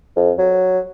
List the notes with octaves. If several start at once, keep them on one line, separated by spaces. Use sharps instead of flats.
F2
F#3